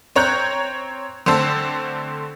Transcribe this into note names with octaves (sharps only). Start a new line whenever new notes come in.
C4 C#5 A#5 F#6 G6
D3 A3 C4 C5 A5 E6